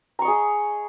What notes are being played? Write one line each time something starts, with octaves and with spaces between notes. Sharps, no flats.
G#4 D#5 A#5 C#6